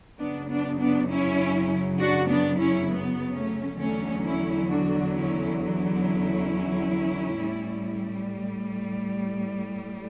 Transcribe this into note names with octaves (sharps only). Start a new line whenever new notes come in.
F#2 C#3 F#3 B3 D4
B3 D4
B3 D4
C#4 E4
D4 F#4
B3 D4
C#4 E4
B3
A3 C#4
E2 D3 F#3 A3 C#4
C#4 E4
D4 F#4
C#4 E4
C#4 E4
A2 G3